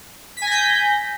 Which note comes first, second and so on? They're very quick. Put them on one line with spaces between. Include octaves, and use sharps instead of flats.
B6 G#5 A#6 G6